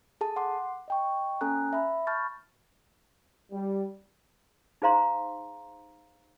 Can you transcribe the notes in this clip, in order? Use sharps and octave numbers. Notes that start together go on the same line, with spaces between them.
G#4 A4 A5
F#5 C6 D6
D#5 G5 C#6
A#3 C#4 A4 G#5 A#5 F#6
E5 B5
A5 B5 C#6 F6 G6 A6
G3
D#4 G#4 C5 F5 A#5 C6